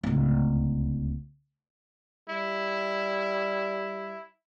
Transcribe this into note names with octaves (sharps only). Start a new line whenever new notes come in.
D1 C#2
G3 E4